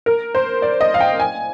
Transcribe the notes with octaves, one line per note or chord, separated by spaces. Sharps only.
A#4
C5
D5
D#5
F5
G5
G#5